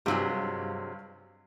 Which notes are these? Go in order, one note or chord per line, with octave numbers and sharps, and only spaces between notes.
G2 C3 F#3 G#3 F4 E6